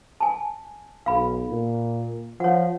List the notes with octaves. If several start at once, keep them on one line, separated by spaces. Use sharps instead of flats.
G#5 A5
B1 F5 B5
A#2
F3 C#5 F#5